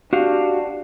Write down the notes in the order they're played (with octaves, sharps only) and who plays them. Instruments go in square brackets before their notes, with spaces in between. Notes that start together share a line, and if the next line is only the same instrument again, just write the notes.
[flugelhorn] D4 [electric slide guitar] F#4 G4 F5